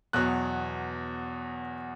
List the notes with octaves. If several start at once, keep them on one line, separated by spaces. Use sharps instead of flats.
E2 B2 F#3 F#6